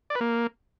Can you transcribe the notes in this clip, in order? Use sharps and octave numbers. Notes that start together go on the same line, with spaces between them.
D5
B4
A#3